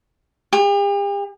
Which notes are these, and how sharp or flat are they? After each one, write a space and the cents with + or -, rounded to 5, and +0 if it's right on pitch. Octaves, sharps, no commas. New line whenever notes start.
G4 +45